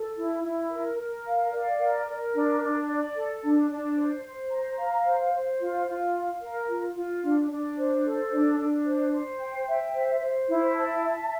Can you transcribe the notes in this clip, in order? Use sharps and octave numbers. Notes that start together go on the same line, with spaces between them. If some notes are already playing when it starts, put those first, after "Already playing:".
Already playing: A4
E4
E4
A#4
A#4
F5
D5
A#4
A#4
D4
D4
D5
A4
D4
D4
C5
C5
A#5
F5
C5
C5
F4
F4
F5
A#4
F4
F4
D4
D4
C5
A4
D4
D4
C5
C5
G5
E5
C5
C5
E4
A5
E5